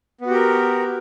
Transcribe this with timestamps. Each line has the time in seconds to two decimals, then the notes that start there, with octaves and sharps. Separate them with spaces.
0.21 B3
0.26 F#4
0.30 G4
0.35 A#4